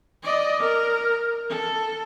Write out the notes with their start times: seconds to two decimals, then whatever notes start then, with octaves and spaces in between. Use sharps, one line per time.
0.23 D5 D#5
0.60 A#4
1.49 A4